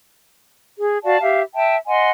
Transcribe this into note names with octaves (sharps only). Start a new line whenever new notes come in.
G#4
F#4 D5 F5 A5
G4 E5 F5
E5 G5 A5
D#5 F#5 G#5 C6